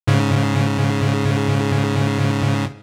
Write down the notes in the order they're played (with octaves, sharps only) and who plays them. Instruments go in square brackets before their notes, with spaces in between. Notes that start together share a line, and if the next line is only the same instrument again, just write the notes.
[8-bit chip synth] G#2 C#3